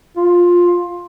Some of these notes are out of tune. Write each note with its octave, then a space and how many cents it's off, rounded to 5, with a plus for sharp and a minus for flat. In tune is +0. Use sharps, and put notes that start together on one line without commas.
F4 +10